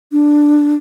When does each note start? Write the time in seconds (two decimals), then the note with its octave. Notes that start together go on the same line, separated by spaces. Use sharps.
0.12 D4